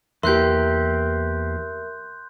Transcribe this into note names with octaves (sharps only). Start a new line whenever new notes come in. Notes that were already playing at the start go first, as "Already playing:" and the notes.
E2 A#3 G4 A#4 E5 C6 F#6 G6